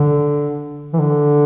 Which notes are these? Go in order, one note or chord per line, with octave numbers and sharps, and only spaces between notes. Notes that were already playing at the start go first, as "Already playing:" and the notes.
Already playing: D3
E3
D3